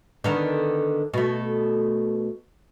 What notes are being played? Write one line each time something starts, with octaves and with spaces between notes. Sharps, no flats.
D3 D#3 B3
B2 A3